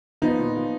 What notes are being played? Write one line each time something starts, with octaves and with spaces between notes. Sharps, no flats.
F3 B3 D#4
A#2
F3